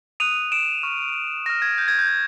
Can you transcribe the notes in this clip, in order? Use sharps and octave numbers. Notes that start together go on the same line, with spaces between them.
D#6 F#6 D#7 F7
D7 E7
C#6 F6
C#6 F6 A#6
G#6
G6
G#6
G6
G6